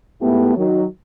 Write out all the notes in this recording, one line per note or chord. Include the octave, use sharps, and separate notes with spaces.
G#2 A3 B3 E4 G4
D#3 F#3